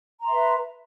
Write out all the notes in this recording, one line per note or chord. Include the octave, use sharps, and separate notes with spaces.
B4 E5 A#5 C6